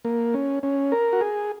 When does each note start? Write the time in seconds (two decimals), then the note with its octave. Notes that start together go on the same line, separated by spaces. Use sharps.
0.05 A#3
0.34 C#4
0.63 C#4
0.92 A#4
1.13 F#4
1.21 G#4